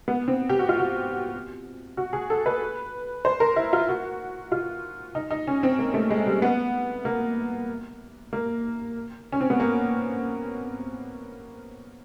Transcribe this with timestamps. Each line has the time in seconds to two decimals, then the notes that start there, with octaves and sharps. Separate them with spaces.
0.08 B3
0.28 C4
0.49 G4
0.59 F#4
0.69 F4
0.79 F#4
1.97 F#4
2.13 G#4
2.30 A4
2.46 B4
3.25 C5
3.40 A#4
3.56 E4
3.73 F4
3.89 F#4
4.52 F4
5.15 D#4
5.31 D#4
5.47 C#4
5.63 C4
5.79 A#3
5.94 A3
6.11 G#3
6.26 G3
6.42 B3
7.05 A#3
8.33 A#3
9.32 C#4
9.41 C4
9.50 B3
9.60 A#3